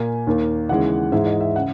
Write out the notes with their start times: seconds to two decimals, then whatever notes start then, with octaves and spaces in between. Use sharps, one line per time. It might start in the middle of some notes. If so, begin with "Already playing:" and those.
Already playing: A#2 A#3 G#5
0.27 D#2 D#3 A#3
0.69 D#2 C#3 E3 G#3 F#5
1.12 G#2 E3 G#3 E5
1.26 D#5
1.41 E5
1.56 C#3 F#5